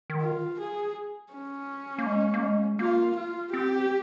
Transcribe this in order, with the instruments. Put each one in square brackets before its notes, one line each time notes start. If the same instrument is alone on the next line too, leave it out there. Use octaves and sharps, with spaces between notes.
[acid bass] D#3
[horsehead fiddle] F4
G#4
C#4
[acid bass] A#3
G#3
A#3
G#3
[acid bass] A#3 [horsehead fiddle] F4
[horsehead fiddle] F4
[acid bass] C4 [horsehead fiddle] G4